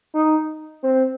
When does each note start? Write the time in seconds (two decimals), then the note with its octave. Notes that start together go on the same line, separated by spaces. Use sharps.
0.15 D#4
0.83 C4